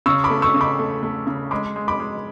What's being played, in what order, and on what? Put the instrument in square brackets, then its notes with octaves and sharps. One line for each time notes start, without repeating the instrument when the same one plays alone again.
[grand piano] C#3 [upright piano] C#6 E6
[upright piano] B5 D6
[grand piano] A3
[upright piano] C#6 E6
[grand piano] C#3
[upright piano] B5 D6
[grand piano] A3
A3
C#3
[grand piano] G#3 [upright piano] B5 D6
[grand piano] G#3
[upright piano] B5 D6
[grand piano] G#3